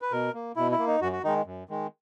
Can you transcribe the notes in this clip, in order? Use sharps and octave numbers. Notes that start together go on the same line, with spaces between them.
B4
B2 A#4
A#3
B2 E4
E4
A#3
D#4
F#2 F#4
F#4
D#3 G#3 D#4
F#2
D#3 G#3